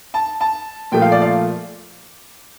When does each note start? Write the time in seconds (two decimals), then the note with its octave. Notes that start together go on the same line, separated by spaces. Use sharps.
0.14 A5
0.41 A5
0.92 A#2 F3 A3 G5
1.02 F5
1.12 D5
1.22 F5